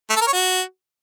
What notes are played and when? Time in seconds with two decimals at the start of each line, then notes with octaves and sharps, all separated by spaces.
0.10 A3
0.16 A4
0.21 A#4
0.27 C#5
0.33 F#4